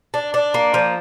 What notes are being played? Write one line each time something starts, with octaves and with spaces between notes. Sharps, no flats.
D4
D4
A#3
F3